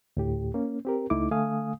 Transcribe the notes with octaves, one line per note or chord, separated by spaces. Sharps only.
D2 A2 G4
A#3 C#4
C4 G4 A#4
C#2 A3 D#4 E4 D6
D3 A3 F5 G#5 D#6